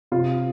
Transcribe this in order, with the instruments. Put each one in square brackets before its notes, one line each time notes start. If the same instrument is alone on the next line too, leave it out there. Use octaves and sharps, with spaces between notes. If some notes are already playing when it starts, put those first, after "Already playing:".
[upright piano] C3 F4